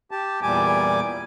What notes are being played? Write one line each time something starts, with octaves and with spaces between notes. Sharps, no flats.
G4 A5
E2 A#2 G3 G#5 D6